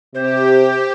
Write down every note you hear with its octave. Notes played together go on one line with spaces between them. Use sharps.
C3 G4 C5